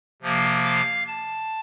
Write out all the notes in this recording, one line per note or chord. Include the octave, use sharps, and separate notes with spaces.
C3 F3 A#3
F5
A5